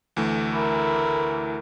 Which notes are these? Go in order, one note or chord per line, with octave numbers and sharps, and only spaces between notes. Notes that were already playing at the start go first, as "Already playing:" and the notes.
D2 E3 A3
E4 A#4